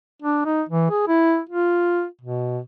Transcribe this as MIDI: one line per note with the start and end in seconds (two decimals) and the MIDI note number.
0.22 0.41 62
0.45 0.62 63
0.69 0.88 52
0.90 1.03 68
1.07 1.40 64
1.49 2.05 65
2.21 2.59 47